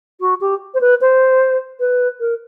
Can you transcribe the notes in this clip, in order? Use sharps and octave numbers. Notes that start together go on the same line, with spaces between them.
F#4
G4
C5
B4
C5
B4
A#4